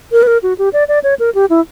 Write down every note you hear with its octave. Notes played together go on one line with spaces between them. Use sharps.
A#4
B4
A#4
F#4
G4
D5
D5
C#5
A#4
G4
E4